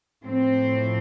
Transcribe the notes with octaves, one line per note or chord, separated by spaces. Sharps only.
A2 F3 C4